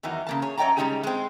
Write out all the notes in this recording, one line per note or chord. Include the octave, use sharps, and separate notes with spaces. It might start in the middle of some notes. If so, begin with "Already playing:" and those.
E2 D#3 E3 F#3
C#3 A#3 A5
G#4 C#5
F#2 C#5 D#5 G5 A5 A#5
C#3 G3 G#3 D#4 G4 G#4
G#3 C4